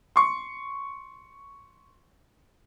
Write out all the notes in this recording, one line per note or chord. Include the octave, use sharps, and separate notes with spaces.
C6 C#6